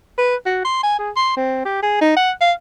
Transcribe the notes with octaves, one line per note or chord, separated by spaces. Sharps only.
B4
F#4
C6
G#5
G#4
C6
C4
G4
G#4
D#4
F#5
F5